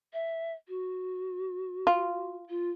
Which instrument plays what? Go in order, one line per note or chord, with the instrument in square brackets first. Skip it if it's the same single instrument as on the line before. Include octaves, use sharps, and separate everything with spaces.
[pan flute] E5
F#4
[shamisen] F4
[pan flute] F4